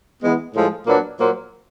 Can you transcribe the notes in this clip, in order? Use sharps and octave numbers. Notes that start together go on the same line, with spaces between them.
E3 G#3 B3
A2 F3 G#3 A4
A#2 F#3 A#3 D4 B4
A#2 F#3 A#3 C5